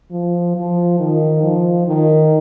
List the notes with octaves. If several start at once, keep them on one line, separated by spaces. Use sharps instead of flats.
F3
F3
D#3
F3
D#3